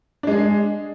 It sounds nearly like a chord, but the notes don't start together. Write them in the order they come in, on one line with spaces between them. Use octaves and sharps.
D4 G#3 G#4